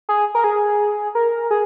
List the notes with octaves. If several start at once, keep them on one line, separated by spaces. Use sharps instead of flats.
G#4
A#4
G#4
A#4
G#4